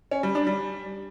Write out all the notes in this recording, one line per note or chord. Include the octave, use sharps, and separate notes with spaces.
C#4
G3
D4
G3